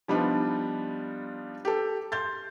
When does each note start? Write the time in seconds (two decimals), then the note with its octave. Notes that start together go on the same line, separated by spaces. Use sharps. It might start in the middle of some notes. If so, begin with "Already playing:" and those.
0.08 F3 G3 B3 D4 D#4 F4
1.65 G4 A4
2.12 C6 G6 A6